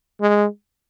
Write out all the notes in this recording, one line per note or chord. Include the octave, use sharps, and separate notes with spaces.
G#3